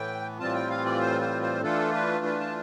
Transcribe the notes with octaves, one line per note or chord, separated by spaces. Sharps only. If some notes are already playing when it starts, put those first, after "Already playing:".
Already playing: A2 E3 B3 G5
A2 E3 G3 C4 F4 A5
G5
F5
D5
C5
C5
C5
E3 A3 D4 F4 A4
B4
B4
A5